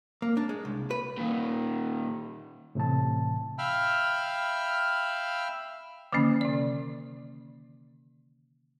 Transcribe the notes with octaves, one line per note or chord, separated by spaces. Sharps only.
A#3
D4
G#3
C2
B4
A#2 D#3
A2 C3 E3 A5
E5 F5 G5 B5 E6 F6
D3 D#3 F3 A#3 C#4
C3 D5